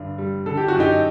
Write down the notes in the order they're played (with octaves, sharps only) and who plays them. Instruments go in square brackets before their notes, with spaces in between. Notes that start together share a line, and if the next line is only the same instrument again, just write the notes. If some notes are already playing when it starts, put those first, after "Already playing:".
Already playing: [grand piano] G2 D3
G3
[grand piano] D3 [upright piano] A4
[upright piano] G4
F#4
[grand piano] F#2
[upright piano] D#4 G4